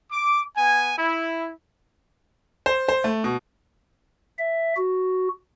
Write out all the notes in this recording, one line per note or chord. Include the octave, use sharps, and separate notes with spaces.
D6
B3 G#5
E4
C5
C5
A3
B2
E5
F#4